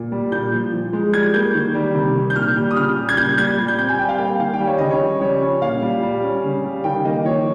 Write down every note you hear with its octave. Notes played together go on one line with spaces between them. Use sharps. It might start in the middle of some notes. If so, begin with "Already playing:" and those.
Already playing: A#2
G3
A#2 G6
F3
F3
G#3
G3 G#6
A#3 G6
D#3
G3
C3
D#3
G6
A#2 F6
G3
D#6
C#3 F6
G3
G#6
A#2 G6
G3 G#6
G3
G6
C4 G6
G#5
G3 G5
F5
A#3 G5
D#3 F5
G5
G3
C#5
C#3 D#5
C#5
F3
G3 C#5
C#4
A#2 F5
G3
G3
C#4
C#3
G3
D#3 G5
A#3 D#5
F3 C#5